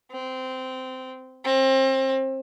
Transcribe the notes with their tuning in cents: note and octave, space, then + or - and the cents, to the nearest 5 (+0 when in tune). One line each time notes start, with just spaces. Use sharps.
C4 -15
C4 +30